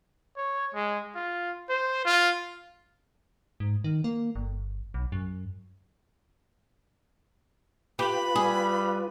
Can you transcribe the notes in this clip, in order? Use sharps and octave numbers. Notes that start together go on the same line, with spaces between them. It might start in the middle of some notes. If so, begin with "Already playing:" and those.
C#5
G#3
F4
C5
F4
G#2
D#3
A#3
G1
B1
F#2
F4 G4 B4 B5
G3 G#4